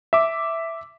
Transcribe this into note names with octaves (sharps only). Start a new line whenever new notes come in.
E5 D6